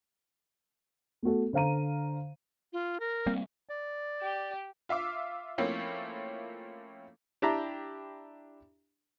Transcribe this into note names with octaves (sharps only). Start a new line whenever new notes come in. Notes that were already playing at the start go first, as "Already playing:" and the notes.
A3 B3 F#4 A4
D3 C5 F5 A#5 D#7
F4
A#4
G3 A#3 C4
D5
G4
F4 E5 F5 D6
F3 A3 A#3 C4 C#4 E4
D4 E4 G4 G5 A#5 B5